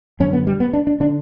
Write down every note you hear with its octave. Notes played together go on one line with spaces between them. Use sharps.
F#2 D3 C#4
B3
G3
B3
D4
D4
D3 D4